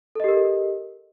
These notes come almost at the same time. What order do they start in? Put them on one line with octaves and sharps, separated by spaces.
A4 D#5 G4 A#4